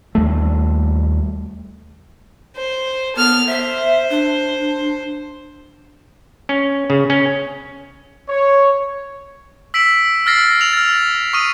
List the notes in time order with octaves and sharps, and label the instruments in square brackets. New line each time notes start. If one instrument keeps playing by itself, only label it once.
[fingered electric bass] D#2 G3 A3
[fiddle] C5
[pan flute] B3 [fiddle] A4 F6
[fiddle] C5 [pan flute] E5
[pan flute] D4
[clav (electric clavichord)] C#4
C#3
C#4
[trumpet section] C#5
[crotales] E6 B6 C7 D7 E7 F#7
E6 F6 A6 A#6 C7
E6 A#6 F7 F#7
F6 A6
A#6
C#6 D#6 F6 D#7